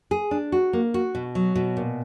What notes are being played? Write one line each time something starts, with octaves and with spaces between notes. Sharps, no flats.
G#4
D4
F#4
A#3
F#4
B2
F#3
B2
A#2